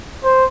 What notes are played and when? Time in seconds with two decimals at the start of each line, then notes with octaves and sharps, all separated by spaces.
0.24 C5